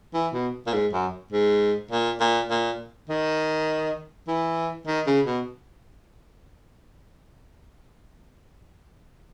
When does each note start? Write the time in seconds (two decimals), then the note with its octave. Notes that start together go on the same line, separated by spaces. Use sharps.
0.14 E3
0.34 B2
0.67 A#2
0.73 G#2
0.93 F#2
1.32 G#2
1.91 A#2
2.20 A#2
2.50 A#2
3.09 D#3
4.28 E3
4.87 D#3
5.07 C#3
5.26 B2